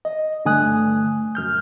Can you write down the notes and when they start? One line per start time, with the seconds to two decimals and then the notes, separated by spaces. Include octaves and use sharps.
0.05 D#5
0.45 G2 D3 A3 G#5 D#6 F#6
1.35 F#2 F6 G6